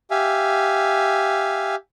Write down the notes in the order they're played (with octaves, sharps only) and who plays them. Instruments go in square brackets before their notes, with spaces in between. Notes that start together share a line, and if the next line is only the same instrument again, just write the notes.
[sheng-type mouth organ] G4 E5 F5 G#5